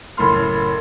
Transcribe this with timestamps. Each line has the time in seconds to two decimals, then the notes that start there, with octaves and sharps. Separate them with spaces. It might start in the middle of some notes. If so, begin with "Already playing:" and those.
0.17 F#1 A2 A4 B5 C6 F6